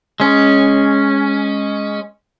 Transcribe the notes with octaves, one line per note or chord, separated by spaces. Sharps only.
G#3 C#4